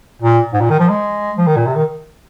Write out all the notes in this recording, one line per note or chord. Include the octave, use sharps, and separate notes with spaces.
A#2
G#2
A#2
D#3
F3
G#3
F3
D#3
A#2
C3
D#3